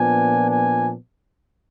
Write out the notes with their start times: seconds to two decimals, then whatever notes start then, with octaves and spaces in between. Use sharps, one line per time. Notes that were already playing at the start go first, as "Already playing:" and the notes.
Already playing: A#2 F3 B3 D4 G#5
0.49 G#5